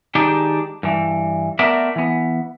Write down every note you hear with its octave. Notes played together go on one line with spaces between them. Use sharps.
D#3 G#3 D4 D#4 G4
G2 E3
A3 B3 A#4 D5 E5
E3 B3